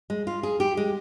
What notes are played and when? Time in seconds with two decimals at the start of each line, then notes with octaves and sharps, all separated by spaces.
0.10 G#3
0.27 F4
0.43 G#4
0.60 G4
0.77 G#3